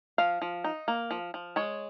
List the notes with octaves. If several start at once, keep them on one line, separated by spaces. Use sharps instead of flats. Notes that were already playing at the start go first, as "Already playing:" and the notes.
F3 F5
F3
D#4
A#3
F3
F3
G#3 C#5